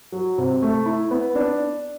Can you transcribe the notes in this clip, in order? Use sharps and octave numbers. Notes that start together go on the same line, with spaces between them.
F#3
C3
A3
E4
B3
D4